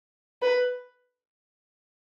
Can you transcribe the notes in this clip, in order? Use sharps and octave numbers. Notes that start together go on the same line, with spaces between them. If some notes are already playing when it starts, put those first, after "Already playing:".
B4